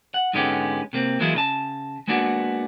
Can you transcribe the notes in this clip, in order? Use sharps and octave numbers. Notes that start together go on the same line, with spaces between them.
F#5
G#2 D3 G#3 B3 C#4 G4
C3 A#3 C4
E3 F#3 G#3 A#3 E4 F4
C#3 D#5 A5
G#3 A#3 B3 D4 F#4